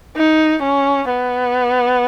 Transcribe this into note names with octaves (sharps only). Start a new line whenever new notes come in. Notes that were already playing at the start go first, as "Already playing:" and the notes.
D#4
C#4
B3